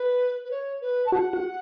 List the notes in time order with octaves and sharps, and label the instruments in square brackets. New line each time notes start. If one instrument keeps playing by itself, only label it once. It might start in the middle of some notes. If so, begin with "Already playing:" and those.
Already playing: [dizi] B4
B4
C#5
B4
A5
[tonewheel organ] F#4 [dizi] F#5
[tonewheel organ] F#4